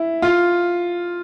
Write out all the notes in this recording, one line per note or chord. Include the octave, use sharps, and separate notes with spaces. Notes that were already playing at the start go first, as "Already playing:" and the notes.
Already playing: E4
F4